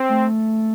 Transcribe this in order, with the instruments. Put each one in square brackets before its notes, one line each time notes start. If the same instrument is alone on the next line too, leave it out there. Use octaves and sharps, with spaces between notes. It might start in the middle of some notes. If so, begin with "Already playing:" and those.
Already playing: [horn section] C4
[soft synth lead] A3